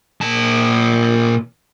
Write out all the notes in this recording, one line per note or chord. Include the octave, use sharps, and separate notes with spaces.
A#2 A5